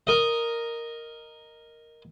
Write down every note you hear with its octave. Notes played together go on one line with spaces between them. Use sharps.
A#4 D#5